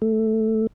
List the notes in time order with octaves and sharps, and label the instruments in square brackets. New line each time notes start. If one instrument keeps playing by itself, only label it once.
[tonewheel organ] A3